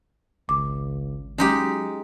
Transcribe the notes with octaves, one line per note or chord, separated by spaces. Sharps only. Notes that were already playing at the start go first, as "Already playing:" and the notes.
G#1 C#2 D6
F#3 G#3 C#4 D#4 G4